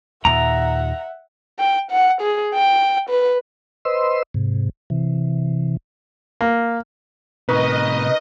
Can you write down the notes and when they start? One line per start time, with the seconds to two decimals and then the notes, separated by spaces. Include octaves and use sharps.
0.25 D#2 A#2 E5 F#5 A#5
1.59 G5
1.91 F#5
2.21 G#4
2.54 G5
3.09 B4
3.85 B4 C5 D#5 C6 E6
4.34 G#2 C3
4.90 C3 E3
6.41 A#3
7.49 A2 C3 D#4 A#4 B4 D#5 C#6